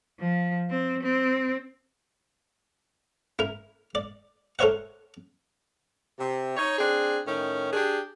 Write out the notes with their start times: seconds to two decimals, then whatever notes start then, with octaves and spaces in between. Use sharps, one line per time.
0.20 F3
0.70 C4
1.03 C4
3.39 E4 A#4
3.95 D5
4.59 A4 A#4 C5 C#5 E5 F#5
6.19 C3
6.56 D#4 C#5
6.78 C4 D4 G#4
7.26 A2 D#3 C#4
7.73 D4 G4 G#4